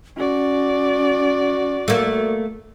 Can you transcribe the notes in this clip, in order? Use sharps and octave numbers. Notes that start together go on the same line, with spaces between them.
C#4 F#4 D5
A3 A#3